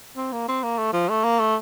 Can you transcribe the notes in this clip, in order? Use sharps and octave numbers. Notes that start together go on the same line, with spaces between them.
C4
A#3
C4
A#3
A3
F3
A3
A#3
A3